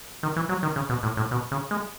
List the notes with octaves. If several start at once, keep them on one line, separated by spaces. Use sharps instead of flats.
D#3
E3
F#3
D#3
C#3
B2
A2
A2
B2
C#3
G#3